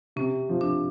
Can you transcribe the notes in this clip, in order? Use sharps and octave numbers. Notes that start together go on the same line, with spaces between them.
C3 C#4
F3
D4